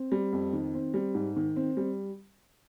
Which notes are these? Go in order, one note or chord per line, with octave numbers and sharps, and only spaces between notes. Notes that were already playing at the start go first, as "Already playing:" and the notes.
Already playing: C4
G3
F2
D#3
C4
G3
G#2
D#3
C4
G3